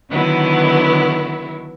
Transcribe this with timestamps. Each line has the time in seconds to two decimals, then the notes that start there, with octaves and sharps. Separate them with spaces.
0.10 D3 D#3 F#3 B3 E4